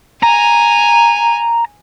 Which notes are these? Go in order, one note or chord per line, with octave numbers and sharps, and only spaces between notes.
G#5 A#5